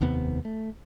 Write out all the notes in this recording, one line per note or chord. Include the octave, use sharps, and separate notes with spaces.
F1 D#2 C3 B3
A3